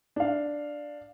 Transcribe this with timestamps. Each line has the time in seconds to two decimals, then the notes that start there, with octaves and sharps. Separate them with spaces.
0.16 D4 F5